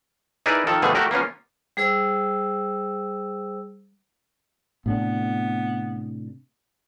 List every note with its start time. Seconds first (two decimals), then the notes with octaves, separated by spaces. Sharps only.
0.46 D#4 E4 G#4 A#4 B4 D5
0.67 D#3 F3 A4 A#4
0.82 B2 D3 F3 G3 A3 G#4
0.95 A3 F#4 G4 A#4
1.11 A#3 B3 C#4 F4
1.77 G3 G#4 C5 E6
4.86 A2 C3 B3 D4